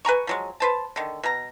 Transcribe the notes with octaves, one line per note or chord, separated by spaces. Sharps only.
B4 G#5 A#5 C#6
F3 F#3 G#3
B4 C5 A5
D3 D#3
B2 A#5